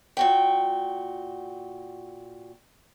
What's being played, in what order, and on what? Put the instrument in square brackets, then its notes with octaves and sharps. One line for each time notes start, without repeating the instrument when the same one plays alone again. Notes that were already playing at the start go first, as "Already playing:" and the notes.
[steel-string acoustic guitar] A#2 F#4 G5